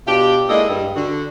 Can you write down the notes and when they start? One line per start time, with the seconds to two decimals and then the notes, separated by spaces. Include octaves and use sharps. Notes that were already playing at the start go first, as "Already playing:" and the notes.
0.07 B2 D4 F4 G4
0.49 G#3 A#3 D4 E4 A4 D#5
0.69 G2
0.96 D3 F#4